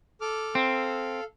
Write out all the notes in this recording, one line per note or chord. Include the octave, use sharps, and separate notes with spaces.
A4 D6 F6
C4 A4 F5